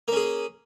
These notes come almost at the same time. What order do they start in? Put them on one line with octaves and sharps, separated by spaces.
A#3 C#4 G#4